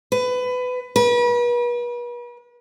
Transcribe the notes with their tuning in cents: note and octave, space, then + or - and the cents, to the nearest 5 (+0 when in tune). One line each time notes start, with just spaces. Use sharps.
B4 +20
B4 -40